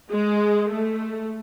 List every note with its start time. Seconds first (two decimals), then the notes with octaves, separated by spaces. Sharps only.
0.11 G#3
0.71 A3